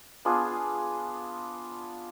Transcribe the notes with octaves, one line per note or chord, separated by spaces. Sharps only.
B3 D4 F4 G#4